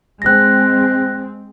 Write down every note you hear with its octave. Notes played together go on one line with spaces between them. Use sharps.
G#3 C4 F#6 A#6